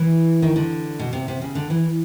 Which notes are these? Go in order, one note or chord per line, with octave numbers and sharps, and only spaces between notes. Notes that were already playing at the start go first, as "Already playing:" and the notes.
Already playing: E3
D#3
D3
B2
C3
C3
C#3
D3
E3